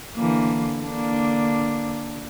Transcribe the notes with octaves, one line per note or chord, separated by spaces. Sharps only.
D3 E3 A#3
D3 A#3 D4